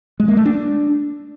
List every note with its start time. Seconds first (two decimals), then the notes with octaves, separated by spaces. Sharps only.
0.20 G#3
0.28 A#3
0.37 A3
0.46 D4